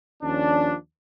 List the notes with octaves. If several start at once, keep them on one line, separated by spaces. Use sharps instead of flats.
D#2 F3 C#4 D4